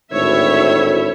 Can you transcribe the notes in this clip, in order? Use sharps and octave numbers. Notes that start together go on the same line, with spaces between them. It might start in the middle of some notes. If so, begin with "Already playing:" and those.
G#1 D2 A2 E4 C#5 E5